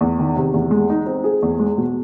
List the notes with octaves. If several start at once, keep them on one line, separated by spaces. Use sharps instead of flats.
E2
D#3
C3
E2
G#3
D#4
C4
G#4
E2
G#3
B2